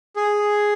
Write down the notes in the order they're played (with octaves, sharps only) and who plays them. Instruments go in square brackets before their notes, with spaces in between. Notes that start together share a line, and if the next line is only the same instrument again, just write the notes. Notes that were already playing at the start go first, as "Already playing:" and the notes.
[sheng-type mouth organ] G#4